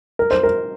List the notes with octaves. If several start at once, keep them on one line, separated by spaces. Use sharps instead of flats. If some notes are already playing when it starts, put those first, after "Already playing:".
A#4
C5
A#4